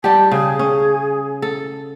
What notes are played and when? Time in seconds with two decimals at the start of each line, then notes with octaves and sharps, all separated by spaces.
0.04 G3 G4 A5
0.31 C#3 G#4
0.59 C#4
1.42 A4